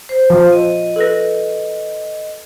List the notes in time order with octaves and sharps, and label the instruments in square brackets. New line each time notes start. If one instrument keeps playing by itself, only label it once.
[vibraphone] C5
[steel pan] F3
[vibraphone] D#5
[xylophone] A4 B4 A#6